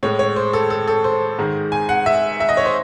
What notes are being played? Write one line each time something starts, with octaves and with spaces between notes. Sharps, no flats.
A2 G#3 C#5
C#5
C5
A4
A4
A4
C5
G#2 D#3 G#3
G#5
F#5
E5
E5
D#5
C#5
C5